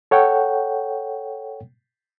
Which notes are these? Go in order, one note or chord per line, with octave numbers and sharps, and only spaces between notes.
A4 C#5 F#5 G5